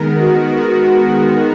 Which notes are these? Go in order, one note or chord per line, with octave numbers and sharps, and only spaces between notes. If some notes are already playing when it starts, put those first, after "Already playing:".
Already playing: D#3 G#3 B3 A#4
F#4
F#4